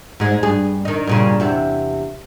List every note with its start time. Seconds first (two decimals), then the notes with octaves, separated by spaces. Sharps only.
0.20 G#2 G#3
0.43 G2 G#4
0.85 D#3 D#4
1.07 G2 A#2 C#3
1.40 E2 C3 E5